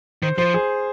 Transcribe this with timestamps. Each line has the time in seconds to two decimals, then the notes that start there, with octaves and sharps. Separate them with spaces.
0.23 D#3 C5
0.38 F3 C5
0.54 G#4